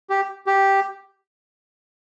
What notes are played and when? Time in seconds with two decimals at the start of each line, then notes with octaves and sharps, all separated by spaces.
0.10 G4
0.47 G4